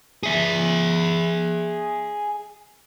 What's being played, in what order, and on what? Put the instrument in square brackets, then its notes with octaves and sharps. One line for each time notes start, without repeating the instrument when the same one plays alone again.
[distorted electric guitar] G#4 E5